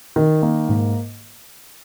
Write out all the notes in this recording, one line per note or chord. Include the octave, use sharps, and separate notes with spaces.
D#3
A#3
G#2